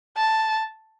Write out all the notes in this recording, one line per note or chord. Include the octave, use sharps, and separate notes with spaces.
A5